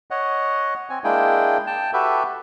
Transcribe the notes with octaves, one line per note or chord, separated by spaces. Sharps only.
C#5 D#5 F#5
C4 G#5
G#3 A#3 D4 E4 G#4 G5
G5 A5
F#4 G4 A4 B4 E5